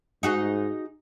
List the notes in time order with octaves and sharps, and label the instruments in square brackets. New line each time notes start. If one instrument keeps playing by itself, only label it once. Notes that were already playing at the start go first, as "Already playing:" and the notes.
[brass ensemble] G#2 [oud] D#4 F#4 G#4